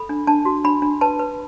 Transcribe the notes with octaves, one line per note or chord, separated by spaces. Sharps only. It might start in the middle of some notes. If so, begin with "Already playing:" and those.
Already playing: A4 B5
D4
D4 A5
F#4
D4 B5
D4
B4 A5
B4